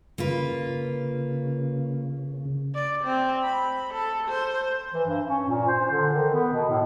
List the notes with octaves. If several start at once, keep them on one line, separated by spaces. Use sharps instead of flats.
C#3 A#3 F4 B4
D5
C4
B5
A4
C5
E3
G2
C#4
A#2
C5
D3
D#3
B3
B2
A2